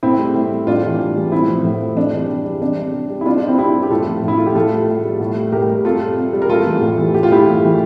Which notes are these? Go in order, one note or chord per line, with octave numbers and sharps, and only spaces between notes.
A2 C4 E4
G3
A2
G3
A2 D4 F4
E3 G3
A2
E3 G3
A2 C4 E4
F3
A2
F3
C3 D4
E3 G3
C3
E3 G3
C3 D4
G3
C3
G3
E4
C3 D4 F4
D4
G3
C4 E4
C3 E4 G4
G3
G4
A2 F4 A4
F3
A2
E4
F3 F4
G4
A2 F4 A4
G3
A2
G3
A2
G3
A2 G4 A#4
G3
C3 F4 A4
G3
C3
G3
A#4
A2 F4 A4
E3 G3
A2
E3 G3
A2 G4
F4
E3 G3 E4 G4
A2
E3 G3